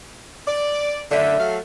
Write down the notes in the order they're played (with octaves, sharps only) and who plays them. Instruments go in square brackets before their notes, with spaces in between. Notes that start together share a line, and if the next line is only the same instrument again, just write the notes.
[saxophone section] D5
[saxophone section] F#2 A2 D3 [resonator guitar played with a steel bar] A3 E5
[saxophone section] F#3 A4 F5